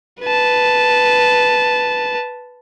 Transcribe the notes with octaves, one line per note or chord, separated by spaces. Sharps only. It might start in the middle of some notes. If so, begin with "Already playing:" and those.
B4 A5